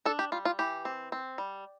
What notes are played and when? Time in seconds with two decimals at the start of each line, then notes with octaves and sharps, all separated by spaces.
0.05 D4 A4
0.19 G4
0.32 G3 F4
0.45 F4
0.59 E3 G4
0.85 C4
1.12 C4
1.38 G3